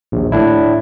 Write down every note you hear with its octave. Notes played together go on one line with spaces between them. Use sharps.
A#1 D#2
A2 D4 E4